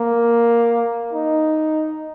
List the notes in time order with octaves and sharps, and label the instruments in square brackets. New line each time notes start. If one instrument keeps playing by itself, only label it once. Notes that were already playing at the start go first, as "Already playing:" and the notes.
Already playing: [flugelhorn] A#3
D#4